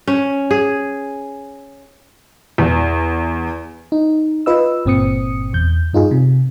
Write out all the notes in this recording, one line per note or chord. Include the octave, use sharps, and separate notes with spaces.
C#4
G#4
E2
D#4
F4 B4 D#5 E6
G1 A#2 C4 D#6 C#7
E2 G6
G2 D#4 F4 G#4
C3